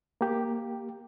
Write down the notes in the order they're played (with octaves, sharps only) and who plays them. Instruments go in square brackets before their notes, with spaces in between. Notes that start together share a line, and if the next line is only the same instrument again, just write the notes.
[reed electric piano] A#3 G4